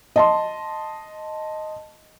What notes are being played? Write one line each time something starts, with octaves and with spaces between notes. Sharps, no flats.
D#5 A5 C6